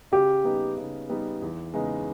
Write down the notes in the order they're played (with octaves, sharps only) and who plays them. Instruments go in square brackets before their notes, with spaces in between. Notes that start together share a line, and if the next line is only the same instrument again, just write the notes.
[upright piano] C#3 [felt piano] G4
[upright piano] G3 B3 D#4
C#3
G3 B3 D#4
E2
C#3 G#3 B3 D#4